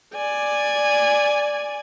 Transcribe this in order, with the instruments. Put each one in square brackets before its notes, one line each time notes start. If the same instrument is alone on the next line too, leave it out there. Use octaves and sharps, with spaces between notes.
[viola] D5 G#5